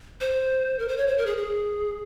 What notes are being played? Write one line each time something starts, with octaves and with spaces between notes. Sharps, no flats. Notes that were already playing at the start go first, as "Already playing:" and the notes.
C5
A#4
C5
C#5
C5
A#4
G#4
G#4